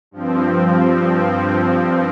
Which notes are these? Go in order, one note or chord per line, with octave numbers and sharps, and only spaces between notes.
G2 F3 C4